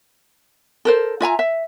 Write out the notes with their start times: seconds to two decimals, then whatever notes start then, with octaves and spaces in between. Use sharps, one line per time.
0.85 A4 A#4 C5
1.21 F4 E5 G#5 A#5
1.39 E5